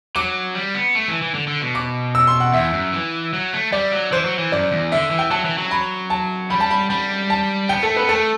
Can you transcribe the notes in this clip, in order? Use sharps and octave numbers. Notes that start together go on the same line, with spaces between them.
F#3 D6
G3
B3
A3
E3
E3
D3
D3
B2
D6
E6
C6
F#5
E2 E5
F#2
E3
F#3
A3
G3 D5
F#3
E3 C5
F#3
E3
F#2 D5
E2
D3 E5
E3
G5
F#3 A5
E3
F#3
B5
A5
G3 B5
A5
B5
G3 B5
A5
B3 G5
A3 A4
B3 B4
A3 A4